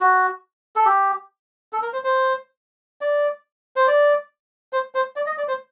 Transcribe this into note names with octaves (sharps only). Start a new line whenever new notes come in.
F#4
A4
G4
A4
A#4
C5
C5
D5
C5
D5
C5
C5
D5
D#5
D5
C5